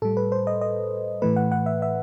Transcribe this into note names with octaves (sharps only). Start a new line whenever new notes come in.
A2 G3 A4
B4
C5
D#5
D#5
A2 E3 A3 B4
F#5
F#5
E5
E5